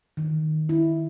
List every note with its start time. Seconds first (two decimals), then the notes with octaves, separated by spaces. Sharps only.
0.17 D#3
0.69 E4